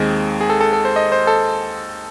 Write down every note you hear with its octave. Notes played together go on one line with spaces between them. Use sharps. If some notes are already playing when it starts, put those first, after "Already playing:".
Already playing: D#2 D#3 G#3 C4 G#4
G#4
A4
A4
A4
C5
D#5
C5
A4